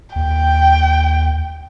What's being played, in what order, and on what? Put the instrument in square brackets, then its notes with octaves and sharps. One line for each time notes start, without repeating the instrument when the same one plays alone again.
[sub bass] D#2 [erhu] G5